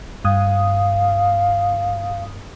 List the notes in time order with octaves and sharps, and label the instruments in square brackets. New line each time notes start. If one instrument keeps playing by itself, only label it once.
[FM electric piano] G2 D#6 [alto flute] F5